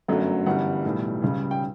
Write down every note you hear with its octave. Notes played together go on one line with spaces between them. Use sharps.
G1 F#2 D3 F#3 A3
G1 F#2 E3 G3 F#5
B1 A2 E3 G3
C#2 C#3 G3
G5